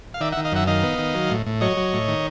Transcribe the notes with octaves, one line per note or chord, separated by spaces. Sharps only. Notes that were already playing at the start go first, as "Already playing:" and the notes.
F5
D#3 D5 E5
E5 F#5
D#3
D#5 F5
F#2 E5 F#5
D#3 D#5 F5
B3
D#3
F#3
A2
A2
F#3 C#5 D#5
F#3
A2
D#3